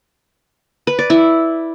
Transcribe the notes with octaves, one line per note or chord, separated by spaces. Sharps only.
B4
D5
E4